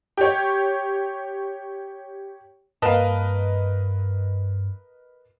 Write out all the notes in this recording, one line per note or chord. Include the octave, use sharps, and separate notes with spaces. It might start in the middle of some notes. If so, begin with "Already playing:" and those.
G4 C#5
G2 A#3 C4 A#4 B4 D#5 F5 A5